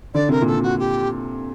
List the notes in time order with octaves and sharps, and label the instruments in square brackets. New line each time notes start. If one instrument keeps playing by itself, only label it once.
[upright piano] D3 [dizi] D5
[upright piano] C3 [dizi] A#4
[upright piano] A#2
[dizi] A4
[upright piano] C3
[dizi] F#4
G4